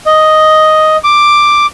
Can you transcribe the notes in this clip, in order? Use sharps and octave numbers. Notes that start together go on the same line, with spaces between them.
D#5
D6